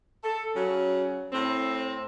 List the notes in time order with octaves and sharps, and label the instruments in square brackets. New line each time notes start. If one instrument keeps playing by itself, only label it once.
[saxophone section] A4
C#3 F#3
A2 C4